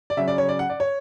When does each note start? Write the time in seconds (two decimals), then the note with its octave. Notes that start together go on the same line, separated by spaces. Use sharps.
0.10 D5
0.17 C#3 F#3 C#4 E5
0.28 D5
0.38 C#5
0.49 D5
0.59 F#5
0.70 D5
0.80 C#5